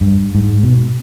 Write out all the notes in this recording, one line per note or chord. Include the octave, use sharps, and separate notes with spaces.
G2
G#2
B2